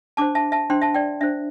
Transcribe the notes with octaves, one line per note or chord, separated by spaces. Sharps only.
D4 C5 A5 D6
E5 A5
E5 A5
D4 C5 G5 C6
E5 A5
D5 G5
D4 C5 E5